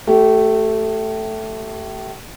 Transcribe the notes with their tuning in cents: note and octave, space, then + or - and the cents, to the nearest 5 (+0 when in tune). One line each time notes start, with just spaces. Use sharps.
A3 +0 G4 -30